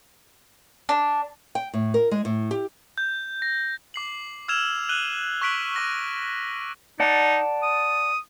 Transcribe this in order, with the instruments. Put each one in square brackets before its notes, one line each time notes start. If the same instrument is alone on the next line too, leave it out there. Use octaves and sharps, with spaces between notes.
[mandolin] D4
[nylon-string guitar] G5
A2
A#4
G#3
A2
G4
[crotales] G6
A#6
D6 C7 F#7
E6 F6 G#6 E7 F7
F#6 D#7 F#7 G7
C#6 F#6 B6 D7 F#7
C#6 D6 A#6 D#7
[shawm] D#4 [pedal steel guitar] D5 F#5 A5
[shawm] D#6